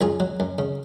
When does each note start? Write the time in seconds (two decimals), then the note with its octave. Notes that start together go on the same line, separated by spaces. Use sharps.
0.01 F#2 F4 G#4
0.20 F#3
0.40 F#2
0.58 C#3